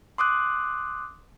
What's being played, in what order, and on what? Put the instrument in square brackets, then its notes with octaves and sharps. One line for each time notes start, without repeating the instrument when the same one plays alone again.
[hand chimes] C6 D6 D#6 F#6